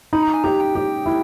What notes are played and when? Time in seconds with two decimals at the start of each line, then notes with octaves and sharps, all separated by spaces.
0.13 D#4 B5
0.23 A#5
0.34 G#5
0.44 G4 A#5
0.60 G5
0.75 G4
1.06 E4